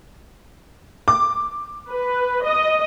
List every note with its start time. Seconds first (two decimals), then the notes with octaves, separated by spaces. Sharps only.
1.08 D6
1.90 B4
2.44 D#5